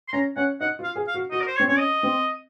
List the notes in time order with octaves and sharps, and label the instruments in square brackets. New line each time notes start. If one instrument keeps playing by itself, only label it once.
[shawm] C6
[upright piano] C#4 [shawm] A#5
[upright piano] C#4 [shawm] F#5
[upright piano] D#4 [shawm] F#5
[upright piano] F4
[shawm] F5
[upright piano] G#4
[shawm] F5
[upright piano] F#4
[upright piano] F#4 [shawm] D#5
[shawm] A#4
C5
C#5
[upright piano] C4
[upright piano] C#4 [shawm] C#5
[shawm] D#5
[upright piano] C4